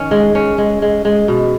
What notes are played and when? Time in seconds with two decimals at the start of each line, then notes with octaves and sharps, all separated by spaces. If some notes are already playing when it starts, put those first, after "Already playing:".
Already playing: D#3 C#4
0.11 G#3
0.35 C#4
0.58 G#3
0.82 G#3
1.05 G#3
1.28 B2